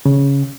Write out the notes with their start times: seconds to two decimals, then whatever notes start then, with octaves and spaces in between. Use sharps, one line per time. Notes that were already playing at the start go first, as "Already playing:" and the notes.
0.06 C#3